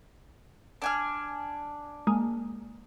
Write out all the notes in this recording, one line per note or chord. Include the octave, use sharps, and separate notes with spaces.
D4 G#5 F6
G#3 A#3